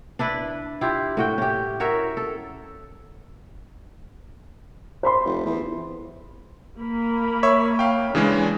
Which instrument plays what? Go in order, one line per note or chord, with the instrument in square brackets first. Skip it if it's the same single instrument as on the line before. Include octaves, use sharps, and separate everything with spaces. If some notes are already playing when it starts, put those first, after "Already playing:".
[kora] D4 E4 B4
E4 F4 G4
A2 F#4 G5
C#4 G4
F#4 A#4 C#5 E5
A4
[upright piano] C5 B5 C6
[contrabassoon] F1
E2
[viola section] A#3 A#4 B5
[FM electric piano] C#5 [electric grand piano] E5
[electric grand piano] F5 G5
[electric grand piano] C#3 E3 G#3 [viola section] D4